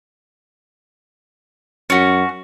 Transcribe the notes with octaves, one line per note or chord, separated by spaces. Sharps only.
F#2 C#4 F#4